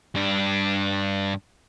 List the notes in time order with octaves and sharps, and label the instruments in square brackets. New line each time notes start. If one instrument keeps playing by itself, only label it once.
[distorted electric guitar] G2 D4